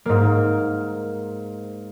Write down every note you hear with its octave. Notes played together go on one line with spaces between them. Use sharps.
G#2 A#3